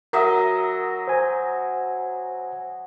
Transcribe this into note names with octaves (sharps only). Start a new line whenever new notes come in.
F#3 A#4 D#5 E5
C5 G#5